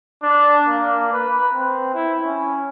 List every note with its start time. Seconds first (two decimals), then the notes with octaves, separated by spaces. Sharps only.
0.23 D4
0.68 A#3
1.13 B4
1.54 C4
1.94 E4
2.24 C#4